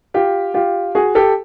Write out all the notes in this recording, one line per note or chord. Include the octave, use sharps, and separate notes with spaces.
F4 G4
F4 G4
F#4 G#4
G4 A4